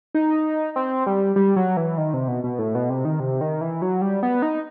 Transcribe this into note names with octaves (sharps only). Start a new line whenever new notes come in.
D#4
C4
G3
G3
F#3
E3
D#3
C3
B2
B2
A2
B2
C3
D#3
C3
D#3
E3
F#3
G3
B3
D#4